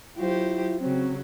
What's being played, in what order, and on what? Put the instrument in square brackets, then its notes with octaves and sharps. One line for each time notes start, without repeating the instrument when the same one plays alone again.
[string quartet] F#3 G4 C5 [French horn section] E4 F4
[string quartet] C#3 F#3 [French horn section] C4